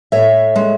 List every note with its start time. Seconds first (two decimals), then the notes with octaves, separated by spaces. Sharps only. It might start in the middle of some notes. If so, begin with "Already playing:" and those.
0.12 A2 C#5 E5
0.56 G#3